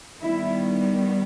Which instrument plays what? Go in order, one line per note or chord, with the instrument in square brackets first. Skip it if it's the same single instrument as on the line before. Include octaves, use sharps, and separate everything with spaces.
[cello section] D#3 G3 B3 E4